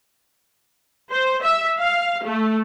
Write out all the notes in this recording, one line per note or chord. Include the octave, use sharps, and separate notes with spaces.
C5
E5
F5
A3